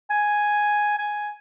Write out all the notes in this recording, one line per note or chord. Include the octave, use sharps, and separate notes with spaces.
G#5
G#5